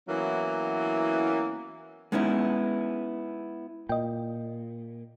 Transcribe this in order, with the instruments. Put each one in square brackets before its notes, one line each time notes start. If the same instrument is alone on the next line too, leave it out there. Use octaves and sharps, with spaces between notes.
[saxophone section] E3 F#3 A#3 B3 C#4 E4
[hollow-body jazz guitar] G#3 B3 C#4 D#4 E4
[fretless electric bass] A#2 [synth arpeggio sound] D#5 G5